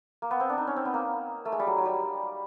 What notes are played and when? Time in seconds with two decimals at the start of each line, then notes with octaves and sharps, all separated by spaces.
0.22 A#3
0.31 B3
0.40 C4
0.50 D4
0.58 D#4
0.67 C#4
0.76 C4
0.85 B3
0.94 A#3
1.45 A3
1.52 G#3
1.59 G3
1.67 F#3
1.78 F#3
1.85 G3